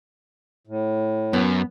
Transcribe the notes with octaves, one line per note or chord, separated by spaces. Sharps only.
A2
F#2 B3